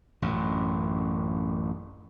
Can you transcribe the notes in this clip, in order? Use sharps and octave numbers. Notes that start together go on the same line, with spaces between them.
A1 F#2